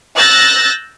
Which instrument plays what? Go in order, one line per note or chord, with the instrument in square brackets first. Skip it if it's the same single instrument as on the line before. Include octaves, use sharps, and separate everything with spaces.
[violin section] E6 F#6 G6 A6 A#6